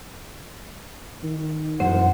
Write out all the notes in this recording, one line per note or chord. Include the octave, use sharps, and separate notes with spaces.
D#3
E1 F#2 C5 F#5